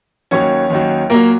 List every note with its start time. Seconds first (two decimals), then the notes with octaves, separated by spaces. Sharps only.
0.31 D#2 D#3 F#3 C#4 C#5
0.70 D#2 D#3 F#3
1.10 A#2 F#3 A#3 A#4